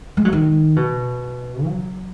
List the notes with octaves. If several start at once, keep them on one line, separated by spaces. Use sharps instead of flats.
G#3
F#3
D#3
B2
F#3